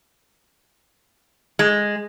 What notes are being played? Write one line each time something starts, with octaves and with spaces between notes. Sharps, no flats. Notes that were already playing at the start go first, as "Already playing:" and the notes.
G#3